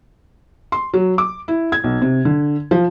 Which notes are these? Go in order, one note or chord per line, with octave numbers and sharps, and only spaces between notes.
C6
F#3
D6
E4
G#6
B1
C3
D3
F3